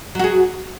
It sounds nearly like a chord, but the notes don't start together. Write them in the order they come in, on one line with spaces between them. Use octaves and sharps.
F#3 F#4 G#4